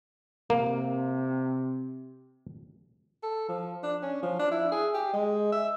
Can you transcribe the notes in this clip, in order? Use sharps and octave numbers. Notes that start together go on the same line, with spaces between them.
C3 A#3
A4
F3
D4
C#4
F3
D4
E4
G#4
G4
G#3
E5